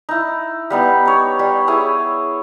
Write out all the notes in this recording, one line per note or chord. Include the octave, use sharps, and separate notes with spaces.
D#4 E4
G3 B3 D#4
D#4 C#5
G3
E4 G#4 C#5 G#5